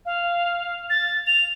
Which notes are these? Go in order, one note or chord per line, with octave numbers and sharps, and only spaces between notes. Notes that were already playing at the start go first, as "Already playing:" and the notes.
F5
A6
F7